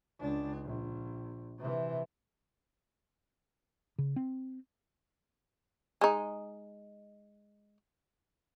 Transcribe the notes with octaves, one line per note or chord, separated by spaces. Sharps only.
C#2 D4
A#1
C3 E3
C#3
C4
G#3 D#4